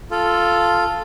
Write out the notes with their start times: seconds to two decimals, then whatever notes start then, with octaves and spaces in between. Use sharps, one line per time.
0.11 F4 A4